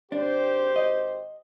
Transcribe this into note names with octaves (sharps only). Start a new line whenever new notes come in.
G#1 D4 G4 C5
D#5